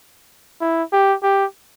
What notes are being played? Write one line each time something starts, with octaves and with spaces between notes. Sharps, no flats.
E4
G4
G4